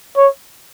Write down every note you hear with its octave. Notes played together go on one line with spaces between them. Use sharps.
C#5